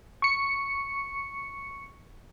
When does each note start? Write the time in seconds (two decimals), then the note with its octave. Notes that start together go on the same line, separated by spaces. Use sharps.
0.22 C#6 C#7